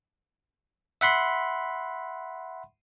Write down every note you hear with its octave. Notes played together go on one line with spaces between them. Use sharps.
E5 F#5 B5 C6